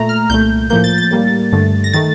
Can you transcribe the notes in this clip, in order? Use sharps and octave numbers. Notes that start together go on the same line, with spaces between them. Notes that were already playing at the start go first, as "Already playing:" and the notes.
Already playing: A#2 A3 A#5
F6
C2 A#2 A3 G6
A2 F3 A#3 G6
A6
A6
A2 G3 A#3
G2 D3 A3
A#6
D#3 A3 A6